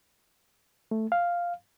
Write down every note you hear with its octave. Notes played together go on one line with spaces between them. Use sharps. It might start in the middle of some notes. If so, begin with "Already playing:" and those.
A3
F5